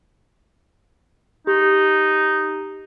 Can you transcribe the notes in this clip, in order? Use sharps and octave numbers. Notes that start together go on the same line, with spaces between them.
D#4 G4